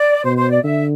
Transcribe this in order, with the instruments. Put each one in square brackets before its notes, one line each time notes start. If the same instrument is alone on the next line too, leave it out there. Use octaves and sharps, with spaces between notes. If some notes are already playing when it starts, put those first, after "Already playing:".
Already playing: [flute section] D5
[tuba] B2 [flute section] C5
[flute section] C5
D5
[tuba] D3 [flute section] E5